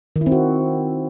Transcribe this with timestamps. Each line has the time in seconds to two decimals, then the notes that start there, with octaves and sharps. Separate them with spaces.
0.16 D#3
0.21 E4
0.26 C4
0.32 F#4